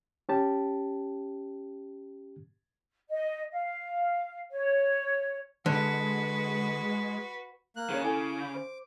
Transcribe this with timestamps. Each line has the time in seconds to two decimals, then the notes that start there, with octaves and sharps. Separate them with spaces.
0.29 C#4 G4 A5
3.10 D#5
3.52 F5
4.51 C#5
5.66 D3 G#3 F#4 B4
7.76 A#3 F#6
7.90 C#3 G#4 C#5
8.04 E4 A4 G#5 D6
8.55 C5